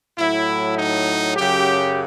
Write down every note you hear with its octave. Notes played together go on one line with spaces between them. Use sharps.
A2 F#3 E4
D#4
F#2 C#3 F#3 G4